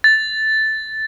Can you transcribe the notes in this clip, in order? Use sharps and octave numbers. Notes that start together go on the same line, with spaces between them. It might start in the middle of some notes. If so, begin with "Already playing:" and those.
A6